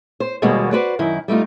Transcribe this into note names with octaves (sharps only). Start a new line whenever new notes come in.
C5
D#2 B2 G3 G#3 A#3 F#4
F#4 B4 C5 D5
F#2 D#3 E4
G3 A3 D#4 F4